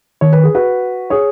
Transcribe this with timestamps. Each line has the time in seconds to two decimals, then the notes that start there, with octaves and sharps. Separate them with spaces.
0.21 D#3 C#5
0.33 B4
0.43 G#4
0.55 F#4 B4
1.10 G#4 C#5